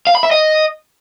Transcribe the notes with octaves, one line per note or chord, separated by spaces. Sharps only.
F5
B5
E5
D#5